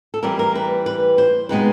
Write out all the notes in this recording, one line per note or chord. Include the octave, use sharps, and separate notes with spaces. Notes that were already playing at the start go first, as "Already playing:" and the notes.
A4
E3 G3 C4 A#4
A#4
B4
B4
C5
B2 G#3 C4 D#4 B4